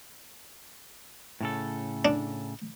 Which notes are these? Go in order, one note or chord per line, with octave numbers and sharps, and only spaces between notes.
A2 C#3 A4
D4